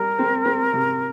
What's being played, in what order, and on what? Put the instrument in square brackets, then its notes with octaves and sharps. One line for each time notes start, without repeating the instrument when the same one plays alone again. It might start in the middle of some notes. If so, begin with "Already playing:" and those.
Already playing: [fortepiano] G3 [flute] A#4
[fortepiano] C4
C4
C3